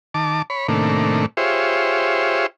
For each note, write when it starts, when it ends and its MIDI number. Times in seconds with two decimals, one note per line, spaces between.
0.14 0.42 51
0.14 0.42 81
0.14 0.42 86
0.50 0.67 73
0.50 0.67 83
0.68 1.26 45
0.68 1.26 48
0.68 1.26 51
0.68 1.26 57
0.68 1.26 58
0.68 1.26 62
1.37 2.46 65
1.37 2.46 67
1.37 2.46 68
1.37 2.46 72
1.37 2.46 73
1.37 2.46 76